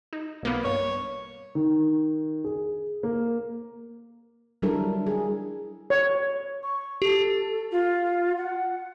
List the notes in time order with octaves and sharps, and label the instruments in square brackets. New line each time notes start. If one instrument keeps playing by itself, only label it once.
[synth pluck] D#4
B1 A#3 B3
[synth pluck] G2 [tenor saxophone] C#5
[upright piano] D#3
G#4
A#3
[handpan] F#3 G3 D4 E4 A4 A#4
G#4
[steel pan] C#5
[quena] C#6
[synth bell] G4 [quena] A4
[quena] F4
F#5